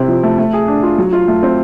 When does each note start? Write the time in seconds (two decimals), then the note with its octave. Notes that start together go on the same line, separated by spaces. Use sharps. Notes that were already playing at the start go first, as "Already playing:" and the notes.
Already playing: C3 C4 E4
0.08 F3
0.23 A3
0.38 A3
0.53 G#4
0.68 D4
0.83 F4
0.98 F#3
1.13 F4
1.28 A3
1.43 C4